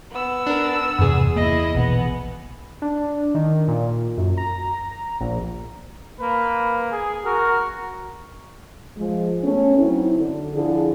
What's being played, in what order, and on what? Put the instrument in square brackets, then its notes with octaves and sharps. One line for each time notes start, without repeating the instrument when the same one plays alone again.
[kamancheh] B3 E6
[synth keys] D4 A#4
[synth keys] E2 G#4 [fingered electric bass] G2 C3
[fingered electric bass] A#3 [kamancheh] E4 D#5
[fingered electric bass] A#1 B2 E3 [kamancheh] B3
[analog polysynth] D4
D#3
A#2
F#2
A#5
A#1
[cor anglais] A#3 [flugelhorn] B4
[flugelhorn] G#4
[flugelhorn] F#4 [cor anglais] A#4
[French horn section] F3 G#3
A3 B3 C#4
F#3 C4 D#4 E4
D3
D3 F3 E4 G#4